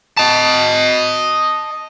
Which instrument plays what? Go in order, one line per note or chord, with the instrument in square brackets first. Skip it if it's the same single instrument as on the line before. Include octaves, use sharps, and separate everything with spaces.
[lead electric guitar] D#5 A5